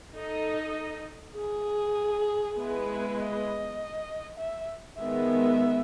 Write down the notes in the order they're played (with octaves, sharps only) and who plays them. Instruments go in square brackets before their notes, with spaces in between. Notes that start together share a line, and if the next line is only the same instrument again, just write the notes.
[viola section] D#4 A4 D#5
[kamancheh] G#4
[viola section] G#3 B3 E4 B4
[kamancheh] D#5
E5
[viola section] D#3 G#3 B3 [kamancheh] E5